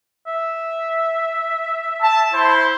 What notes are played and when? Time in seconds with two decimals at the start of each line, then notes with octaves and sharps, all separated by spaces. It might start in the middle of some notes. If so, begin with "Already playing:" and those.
0.27 E5
2.02 A5
2.34 E4 C5 C6